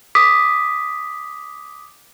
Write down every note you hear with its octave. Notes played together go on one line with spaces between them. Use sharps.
D6 D#6 B6